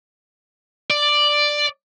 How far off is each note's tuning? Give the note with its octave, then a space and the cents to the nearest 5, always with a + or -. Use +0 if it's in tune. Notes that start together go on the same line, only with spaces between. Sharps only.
D5 +5